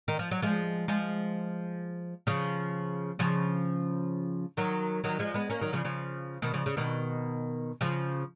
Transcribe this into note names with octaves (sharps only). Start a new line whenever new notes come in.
D#3
F3
F#3
F3 G#3
F3 G#3
C#3 F3
C#3 F3
D#3 F#3
D#3 F#3
F3 G#3
G#3 B3
A#3 C#4
D#3 F#3
C#3 F3
C#3 F3
B2 D#3
C#3 F3
C#3
B2 D#3
C#3 F3